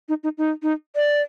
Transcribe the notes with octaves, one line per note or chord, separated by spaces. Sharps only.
D#4
D#4
D#4
D#4
D5